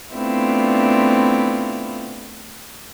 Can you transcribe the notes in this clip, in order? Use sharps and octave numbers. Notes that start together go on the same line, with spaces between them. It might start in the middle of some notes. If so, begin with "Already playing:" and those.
A3 B3 C4 D4 E4 F4